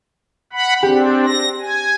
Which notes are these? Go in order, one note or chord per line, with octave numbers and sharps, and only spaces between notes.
F#5 B5
C4 D4 G4
A#6
G#5